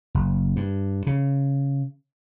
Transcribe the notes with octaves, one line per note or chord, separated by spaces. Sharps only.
F#1
G2
C#3